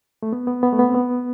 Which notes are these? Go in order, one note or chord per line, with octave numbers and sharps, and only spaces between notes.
A3
B3
B3
B3
A3
B3
C4
B3